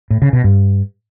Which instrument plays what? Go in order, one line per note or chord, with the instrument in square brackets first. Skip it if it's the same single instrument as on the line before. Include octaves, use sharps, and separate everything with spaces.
[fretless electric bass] A2
C#3
B2
G2